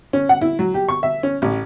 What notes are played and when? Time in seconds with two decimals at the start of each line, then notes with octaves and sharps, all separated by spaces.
0.13 C#4
0.29 F#5
0.41 E4
0.59 F#3
0.74 G4
0.89 C#6
1.03 E5
1.23 C#4
1.42 A1